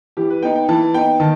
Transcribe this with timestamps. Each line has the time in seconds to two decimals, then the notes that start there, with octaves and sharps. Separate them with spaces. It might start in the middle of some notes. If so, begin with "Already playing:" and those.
0.17 E3 G4
0.30 B4
0.42 B3 D#4 G5
0.55 G5
0.69 E3 A5
0.94 B3 D#4 G5
1.20 D#3 A5